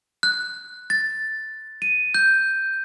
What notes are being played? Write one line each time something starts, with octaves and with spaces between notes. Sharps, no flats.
F#6
A6
D#7
G6